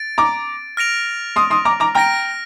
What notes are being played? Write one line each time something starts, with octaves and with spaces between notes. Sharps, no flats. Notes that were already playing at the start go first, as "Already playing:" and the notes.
Already playing: A6 D7
A#5 D6
F6 A#6 D7 F7
C6 D#6
C6 D#6
A#5 D6
A#5 D6
G5 A#5 F6 A#6 D7